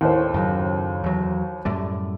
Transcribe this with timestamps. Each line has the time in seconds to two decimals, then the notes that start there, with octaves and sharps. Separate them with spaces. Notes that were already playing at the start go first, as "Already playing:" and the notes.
0.01 D#2 A2 C5
0.34 F#2 C#3 F#3
1.04 E2 F#3
1.65 F#2 A2 G3